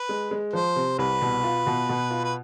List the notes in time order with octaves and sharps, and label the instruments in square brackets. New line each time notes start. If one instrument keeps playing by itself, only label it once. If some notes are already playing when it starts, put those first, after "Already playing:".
Already playing: [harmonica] B4
[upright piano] G#3
G#3
[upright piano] F3 [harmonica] C5
[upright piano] C3
[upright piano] C2 [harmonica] B4
[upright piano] B2
F4
B2
B2
F4
[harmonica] B4